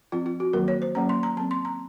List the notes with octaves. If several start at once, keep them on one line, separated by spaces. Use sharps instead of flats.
F3 C4 F4
F4
F#4
D#3 F#3 A#3 A#4
C#5
C5
F#3 A#3 C#4 A#5
C6
A#5
F#3 C4 A5
C6
A#5